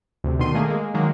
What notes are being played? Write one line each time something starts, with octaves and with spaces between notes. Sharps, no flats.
D2 C3
B2 D3 D#3 C6 D#7
D#3 A3 A#3 G#4
G#3 A#3
D#3 F#3 G#3 A#3